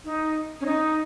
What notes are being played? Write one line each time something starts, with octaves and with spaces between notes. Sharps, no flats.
D#4
C#4
D#4